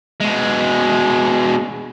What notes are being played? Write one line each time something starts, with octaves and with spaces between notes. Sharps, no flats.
B2 G#3